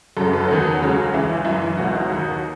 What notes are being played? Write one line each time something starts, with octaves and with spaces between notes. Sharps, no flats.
F#2 C#3 F#3 A4
B4
A4
E2 D#3 F#3
C#2 C#3 F#3
C#2 C#3 E3 E4
E4
F#2 E3 E4
E4
C#2 B2 F#3 F#4
D#4
D#2 D#3 F#3